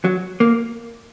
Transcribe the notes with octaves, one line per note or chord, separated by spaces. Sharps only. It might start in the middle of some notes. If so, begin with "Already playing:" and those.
F#3
A#3